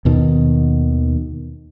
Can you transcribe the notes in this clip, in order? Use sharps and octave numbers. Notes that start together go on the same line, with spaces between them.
D#2 B2 D#3